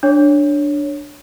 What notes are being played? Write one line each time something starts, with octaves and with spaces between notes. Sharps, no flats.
D4 C#5